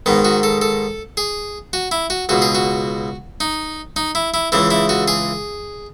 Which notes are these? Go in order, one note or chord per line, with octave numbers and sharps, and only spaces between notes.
G#2 D#3 B3
F#4
A4
A4
G#4
F#4
E4
F#4
C#2 B2 F#4
G#4
F#4
D#4
D#4
E4
E4
C#2 C#3 E3 E4
E4
F#4
G#4